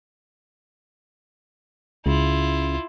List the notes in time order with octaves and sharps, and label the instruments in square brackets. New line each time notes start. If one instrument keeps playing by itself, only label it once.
[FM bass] C#2 [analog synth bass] C#3 [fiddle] E4 F4